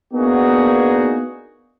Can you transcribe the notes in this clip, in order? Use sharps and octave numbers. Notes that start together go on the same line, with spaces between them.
A#3 B3 D4 D#4 F#4 G#4